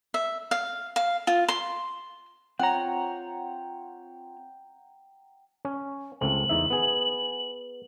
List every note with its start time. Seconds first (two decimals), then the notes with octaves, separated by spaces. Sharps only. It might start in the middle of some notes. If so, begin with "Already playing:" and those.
0.14 E5
0.51 F5
0.96 F5
1.27 F4
1.48 C6
2.59 C4 F4 C#5 F#5 G5 A#5
5.65 C#4
6.21 C#2 A3 C4 F#7
6.49 E2 D#4 E5
6.70 B3 G#4